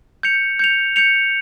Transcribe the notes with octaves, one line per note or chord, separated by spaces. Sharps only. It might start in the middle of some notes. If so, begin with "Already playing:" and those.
G6 C#7 F7
G6 C#7 F7
G6 C#7 F7